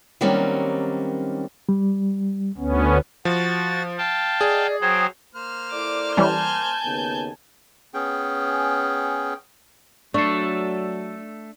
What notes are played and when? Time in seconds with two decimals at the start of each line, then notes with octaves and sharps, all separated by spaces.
0.21 D#3 F#3 G3 A#3 C4 C#4
1.69 G3
2.58 D2 B3 C#4
3.25 F3 F#4 A6
3.98 F5 G5 A5
4.41 G#4 D5 D#5
4.81 F#3 C5 G5 D#6 G#6
5.35 A#3 C5 F6
5.71 E4 A4 D5 D6
6.17 E3 G3 C#4 G#5 A5 G6
6.84 D#2 C#3 B3
7.94 B3 C#4 G#4 G5
10.14 F#3 A3 D4 A4 C#6 C7